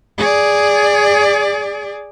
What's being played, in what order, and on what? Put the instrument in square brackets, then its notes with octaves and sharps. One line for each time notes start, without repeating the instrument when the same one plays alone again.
[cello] G#4 D5